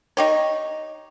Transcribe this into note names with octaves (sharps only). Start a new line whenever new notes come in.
D#4 G4 C#5